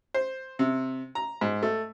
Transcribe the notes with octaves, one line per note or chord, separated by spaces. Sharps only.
C5
C3
A#5
G#2
A3